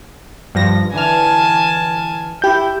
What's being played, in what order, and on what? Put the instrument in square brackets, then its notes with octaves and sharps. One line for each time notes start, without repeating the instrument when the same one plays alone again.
[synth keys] G2 F3 A#6
[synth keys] D3 E3 F6 [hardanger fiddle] G#5 A5
[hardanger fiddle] E4 [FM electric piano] G4 G6